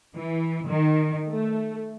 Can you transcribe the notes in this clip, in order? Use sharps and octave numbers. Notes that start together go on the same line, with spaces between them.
E3
D#3
A3